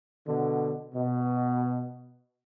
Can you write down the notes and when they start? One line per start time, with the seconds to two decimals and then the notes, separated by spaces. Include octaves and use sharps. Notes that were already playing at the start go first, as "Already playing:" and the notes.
0.27 B2 D3
0.94 B2